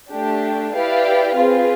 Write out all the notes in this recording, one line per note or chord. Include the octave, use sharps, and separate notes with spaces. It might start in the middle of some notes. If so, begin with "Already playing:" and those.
A3 D4 G4
E4 G4 B4 D5 F5
C4 F4 G#4 B4